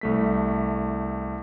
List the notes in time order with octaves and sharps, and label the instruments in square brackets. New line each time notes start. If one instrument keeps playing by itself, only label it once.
[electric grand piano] C2 A3 B6